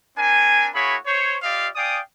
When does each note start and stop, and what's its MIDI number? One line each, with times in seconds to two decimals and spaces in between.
0.18 0.68 60
0.18 0.68 62
0.18 0.68 70
0.18 0.68 80
0.75 0.96 58
0.75 0.96 64
0.75 0.96 66
0.75 0.96 68
0.75 0.96 73
0.75 0.96 83
1.07 1.37 72
1.07 1.37 73
1.43 1.68 65
1.43 1.68 67
1.43 1.68 74
1.43 1.68 75
1.43 1.68 77
1.76 2.00 74
1.76 2.00 77
1.76 2.00 79
1.76 2.00 80
1.76 2.00 87